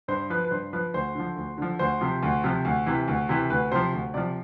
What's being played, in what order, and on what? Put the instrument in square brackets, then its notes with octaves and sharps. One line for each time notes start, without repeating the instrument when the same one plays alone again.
[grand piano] G2 C5
F3 B4
B4
G2 C5
F3 B4
D2 C5
D3 F3
D2
D3 F3
D2 C5
C3 F3
D2
C3 F3
D2
C3 E3
D2
C3 E3
D2 B4
C3 F3 C5
D2
C3 F3 D5